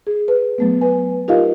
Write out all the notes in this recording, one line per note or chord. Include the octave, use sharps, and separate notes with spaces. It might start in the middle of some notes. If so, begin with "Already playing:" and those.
G#4
B4
F#3 A3 B3
B4 G#5
D#4 F4 G4 A#4 D#5 F5